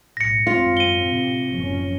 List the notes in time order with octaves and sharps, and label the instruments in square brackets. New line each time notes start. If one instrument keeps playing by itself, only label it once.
[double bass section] B1 A2 [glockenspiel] A#6 C#7
[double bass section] G#1 F#2 C4 [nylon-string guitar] F4
[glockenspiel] D#7 G7
[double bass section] A2 C3 C4
F#1 F3 C#4